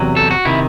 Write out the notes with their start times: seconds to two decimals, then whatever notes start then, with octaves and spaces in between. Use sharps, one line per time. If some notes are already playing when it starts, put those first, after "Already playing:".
Already playing: E2 C3 F#3
0.16 A4
0.31 F#4
0.45 C3 D#3 E4